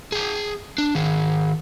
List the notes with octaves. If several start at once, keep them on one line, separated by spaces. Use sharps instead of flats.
G#4 G5
D4
D#3 G#4